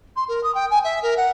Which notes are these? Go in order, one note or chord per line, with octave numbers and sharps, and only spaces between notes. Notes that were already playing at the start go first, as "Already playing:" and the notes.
C6
A#4
D#6
G5
G#5
E5
A#4
F#5